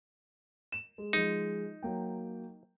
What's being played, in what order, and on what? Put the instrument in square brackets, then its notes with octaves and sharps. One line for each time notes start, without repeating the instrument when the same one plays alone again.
[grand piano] E7
G#3
[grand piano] F3 G#3 [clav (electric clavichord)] D#4
[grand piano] F#3 A#3 G5